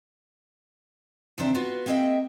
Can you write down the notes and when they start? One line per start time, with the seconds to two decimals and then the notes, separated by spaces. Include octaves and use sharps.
1.38 D#2 C3 C4 D4 C5 E5
1.54 B3 F4 F#4 B4
1.86 A#3 C4 G#4 D#5 E5 G5